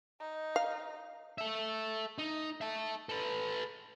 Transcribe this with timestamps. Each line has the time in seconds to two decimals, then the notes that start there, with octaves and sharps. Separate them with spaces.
0.20 D#4
0.56 F5
1.38 A4 E5
2.18 D#4
2.61 E5 A5
3.09 A4 B4